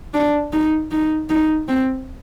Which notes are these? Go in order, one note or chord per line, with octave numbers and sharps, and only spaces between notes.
D4
D#4
D#4
D#4
C4